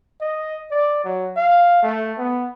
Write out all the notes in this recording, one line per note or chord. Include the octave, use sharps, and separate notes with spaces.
D#5
D5
F#3
F5
A3
B3